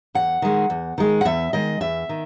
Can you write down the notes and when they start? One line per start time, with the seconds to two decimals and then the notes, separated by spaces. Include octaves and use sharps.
0.15 E2 F#5
0.42 D#3 G#3
0.70 E2
0.98 D#3 G#3
1.21 F#5
1.25 E2 E5
1.53 D#3 G#3 D#5
1.81 E2 E5
2.09 D#3